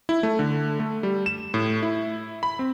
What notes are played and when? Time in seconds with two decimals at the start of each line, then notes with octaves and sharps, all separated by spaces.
0.09 E4
0.23 A3
0.39 D3
0.80 A3
1.03 G3
1.26 E7
1.54 A2
1.83 E4
2.43 B5
2.59 C4